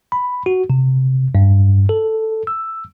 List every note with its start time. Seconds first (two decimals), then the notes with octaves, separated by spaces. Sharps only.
0.12 B5
0.46 F#4
0.70 C3
1.35 G2
1.89 A4
2.47 E6